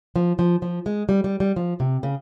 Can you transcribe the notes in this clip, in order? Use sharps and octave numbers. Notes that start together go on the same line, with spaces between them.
F3
F3
F3
G#3
G3
G3
G3
F3
C3
C#3